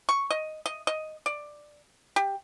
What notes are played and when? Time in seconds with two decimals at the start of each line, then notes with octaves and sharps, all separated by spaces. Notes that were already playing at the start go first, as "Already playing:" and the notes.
0.09 C#6
0.30 D#5
0.66 D#5
0.87 D#5
1.26 D5
2.16 G4